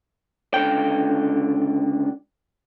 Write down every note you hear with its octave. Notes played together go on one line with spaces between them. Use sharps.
C#2 G2 D3 G5